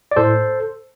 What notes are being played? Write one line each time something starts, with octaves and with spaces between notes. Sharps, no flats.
D5
A2 A4 C5